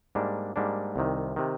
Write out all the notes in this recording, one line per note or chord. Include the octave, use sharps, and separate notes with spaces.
G#2 G3 A#3 D4
G#2 G3 A#3 D4
C2 C3 D#3
C3 D#3